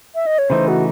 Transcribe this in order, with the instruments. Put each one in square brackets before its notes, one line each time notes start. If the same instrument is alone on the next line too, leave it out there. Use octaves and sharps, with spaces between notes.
[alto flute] E5
D#5
C#5
[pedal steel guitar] C#3 E3 A3 D#4 [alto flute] C5
[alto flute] F#4